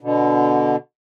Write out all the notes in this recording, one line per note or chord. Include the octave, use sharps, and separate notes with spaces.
B2 D3